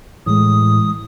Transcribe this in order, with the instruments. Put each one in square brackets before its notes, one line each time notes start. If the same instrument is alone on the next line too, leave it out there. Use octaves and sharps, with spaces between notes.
[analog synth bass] A2 [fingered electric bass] E3 G#3 [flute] D#6